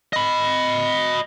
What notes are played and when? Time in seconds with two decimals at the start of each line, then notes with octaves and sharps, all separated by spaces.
0.13 D#5 B5